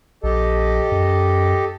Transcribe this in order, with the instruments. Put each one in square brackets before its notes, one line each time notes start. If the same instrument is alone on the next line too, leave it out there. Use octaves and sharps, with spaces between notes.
[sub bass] A#1 [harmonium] G4 A4 D#5
[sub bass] F#2